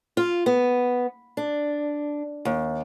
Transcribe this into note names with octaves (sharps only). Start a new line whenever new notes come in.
F4
B3
D4
D#2